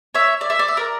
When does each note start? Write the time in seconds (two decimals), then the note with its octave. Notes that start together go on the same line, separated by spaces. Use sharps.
0.14 C#5 E5
0.41 D5
0.50 E5
0.59 D5
0.68 E5
0.77 A#4 D5